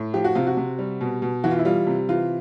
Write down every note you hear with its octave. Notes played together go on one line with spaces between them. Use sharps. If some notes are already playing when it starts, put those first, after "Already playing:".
Already playing: A2
F3 G4
F#4
C3 F4
F#4
C3
G3
B2
B2
E3 F#4
F4
E4
G3 F4
C3
E3 F4